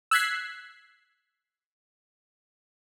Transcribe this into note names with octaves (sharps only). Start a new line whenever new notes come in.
E6 F#6 G#6 B6 C7